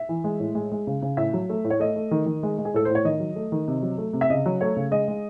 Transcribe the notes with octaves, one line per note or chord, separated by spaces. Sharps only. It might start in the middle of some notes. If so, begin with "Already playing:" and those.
Already playing: E5
E3
G#3
A2
G#3
G#3
C#3
C#3
A2 E5
F#3
A3
A2
C#5
A3 D#5
A3
D#3
D#3
G#3
G#3
G#4
A2 A4
A2 C5
C#5
D#3 D#5
F#3
A3
D#3
C3
F#3
A3
C3
E5
C#3 D#5
F#3
A3 C#5
C#3
G#3 D#5
G#3